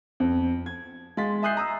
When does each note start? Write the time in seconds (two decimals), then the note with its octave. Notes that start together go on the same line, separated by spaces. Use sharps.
0.20 F2
0.66 G#6
1.17 G#3 F5 C6 A6 B6
1.43 E5 G#5 D#6 F#6 G6 C7
1.57 A#5 D#6 E6